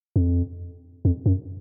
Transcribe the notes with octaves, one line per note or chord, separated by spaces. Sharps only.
F2
F2
F#2